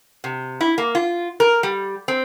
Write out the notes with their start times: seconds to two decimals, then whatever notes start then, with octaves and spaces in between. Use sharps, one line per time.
0.24 C3
0.61 E4
0.78 A#3
0.95 F4
1.40 A#4
1.63 G3
2.08 C4